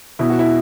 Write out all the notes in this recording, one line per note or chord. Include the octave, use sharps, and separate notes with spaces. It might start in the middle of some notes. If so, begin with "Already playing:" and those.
B2 E4
F#4
E4